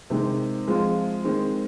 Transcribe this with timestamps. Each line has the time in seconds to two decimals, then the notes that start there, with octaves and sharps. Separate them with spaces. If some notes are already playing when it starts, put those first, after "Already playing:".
0.10 C3 D#3 G#3 D#4
0.68 F3 G#3 C4 F4
1.24 D#3 G#3 C4